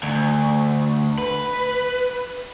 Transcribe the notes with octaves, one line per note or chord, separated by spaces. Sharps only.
D2
B4